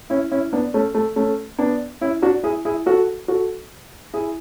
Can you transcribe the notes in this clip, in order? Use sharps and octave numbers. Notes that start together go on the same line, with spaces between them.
C#4 E4
C#4 E4
B3 D4
A3 C#4
A3
A3 C#4
B3 D4
C#4 E4
D4 F#4
E4 G#4
E4 G#4
F#4 A4
F#4 A4
E4 G#4